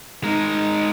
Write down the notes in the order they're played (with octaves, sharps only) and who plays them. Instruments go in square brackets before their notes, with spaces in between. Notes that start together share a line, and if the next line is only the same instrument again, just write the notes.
[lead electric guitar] G#3 A#4 [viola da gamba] D#4